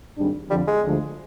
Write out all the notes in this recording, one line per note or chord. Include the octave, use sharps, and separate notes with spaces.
G#1 G#2 G3 D4
F2 D3 F3 G3
G#3
D2 D3 F3 G#3